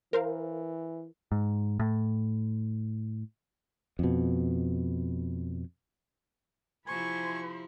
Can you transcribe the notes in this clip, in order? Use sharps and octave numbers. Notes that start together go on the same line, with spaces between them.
E3 A#4 C5 F5
G#2
A2
F2 B2
C3 F3 E4 C5 G#5 B5 C#6